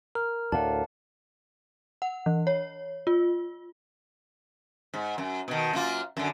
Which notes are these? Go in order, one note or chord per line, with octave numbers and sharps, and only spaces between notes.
A#4 F6
D2 A2 D5 F5 F#5 A5
F#5
E3
C#5
F4
G#2
F#2
B2 D#3
F#2 A#3 F4
F#2 D3